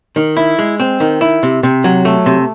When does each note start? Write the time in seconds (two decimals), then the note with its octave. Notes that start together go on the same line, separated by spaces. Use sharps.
0.16 D#3
0.37 E4
0.59 G#3
0.80 C4
1.00 D#3
1.21 E4
1.43 C3
1.63 C3
1.84 F#3
2.05 A3
2.26 C3